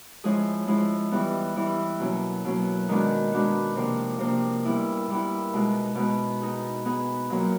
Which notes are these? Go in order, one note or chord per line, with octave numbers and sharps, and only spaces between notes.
F3 G#3 C#4 E4 G#4
F3 G#3 C#4 E4 G#4
E3 G3 B3 E4
E3 G3 B3 E4
B2 F#3 A#3 C#4
B2 F#3 A#3 C#4
D#3 G#3 B3 D4 F#4
D#3 G#3 B3 D4 F#4
C3 F3 A#3 D4
C3 F3 A#3 D4
A#2 G3 B3 E4
A#2 G3 B3 E4
B2 G#3 B3 D#4
B2 G#3 B3 D#4
B3 D#4 G#4
B3 D#4 G#4
A#2 F#3 A#3